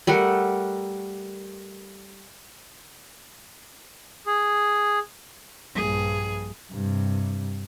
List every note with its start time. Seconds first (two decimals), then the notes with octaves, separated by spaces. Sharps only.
0.07 G3 A3 A#4 F#5
4.27 G#4
5.75 A#1 G2 G#4
6.72 G2 C3